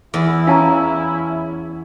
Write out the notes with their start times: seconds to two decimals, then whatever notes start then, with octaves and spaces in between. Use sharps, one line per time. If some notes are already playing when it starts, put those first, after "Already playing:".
0.14 E2 E4
0.47 C#4 F5 A5 A#5